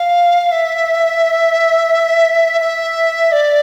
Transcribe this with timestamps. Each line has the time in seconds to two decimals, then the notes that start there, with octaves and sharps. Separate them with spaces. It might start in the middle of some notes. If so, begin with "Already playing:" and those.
Already playing: F5
0.52 E5
2.61 E5
3.32 D5